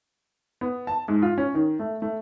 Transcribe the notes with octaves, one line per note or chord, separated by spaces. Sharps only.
B3
A5
G#2
F4
C#4
D#3
A3
A3